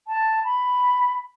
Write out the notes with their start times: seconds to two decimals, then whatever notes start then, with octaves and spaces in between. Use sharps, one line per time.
0.07 A5
0.44 B5